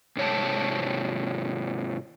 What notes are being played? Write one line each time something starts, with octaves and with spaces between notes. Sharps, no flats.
G#2 C3 C#5 G5 A5